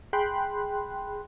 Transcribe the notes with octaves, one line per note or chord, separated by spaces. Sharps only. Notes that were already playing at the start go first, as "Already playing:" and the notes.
G#4 G5 B5 C6 F#6